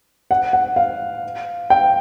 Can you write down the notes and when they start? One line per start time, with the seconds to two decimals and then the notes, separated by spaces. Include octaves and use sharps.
0.31 F#5
0.53 F#5
0.76 F5
1.70 G5